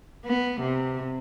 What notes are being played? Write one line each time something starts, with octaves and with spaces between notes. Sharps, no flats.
B3
C3